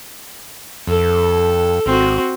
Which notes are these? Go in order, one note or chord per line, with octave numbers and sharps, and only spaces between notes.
F2 A4
G#1 C4 F#4